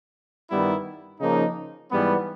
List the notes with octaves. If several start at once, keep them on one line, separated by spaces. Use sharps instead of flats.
G2 D#3 G3 B3 E4
C#3 F3 A#3 D#4
G#2 E3 G3 B3